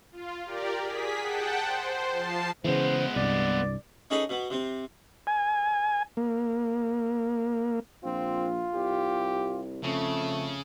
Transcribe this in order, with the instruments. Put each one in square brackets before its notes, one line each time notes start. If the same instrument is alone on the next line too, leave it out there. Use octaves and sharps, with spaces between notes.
[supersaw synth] F4
G4 A#4 D5
G#4 B6
F#5 G5 A5
C5
F3 A5 C7
[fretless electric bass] C#3 E3 [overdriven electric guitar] G#3 B3 [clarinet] C5
[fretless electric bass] C2 G2 [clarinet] D5
[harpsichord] C#4 D#4 G#4 A4 B4
B2 B3
C3 C4
[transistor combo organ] G#5
A#3
[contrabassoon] A#1 [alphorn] C4 [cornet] F4
[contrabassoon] C2 [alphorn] G4
[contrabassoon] F2 [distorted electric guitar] C#3 [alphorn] A3